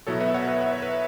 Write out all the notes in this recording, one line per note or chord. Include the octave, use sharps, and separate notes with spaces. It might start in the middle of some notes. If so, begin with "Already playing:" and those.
B2 F#3 B3 E4 A4 C#5
B4 E5
C#5 F#5
B4 E5
E5
C#5
B4